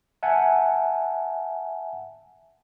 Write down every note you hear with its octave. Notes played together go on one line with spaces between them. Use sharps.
E5 F#5 G#5 A5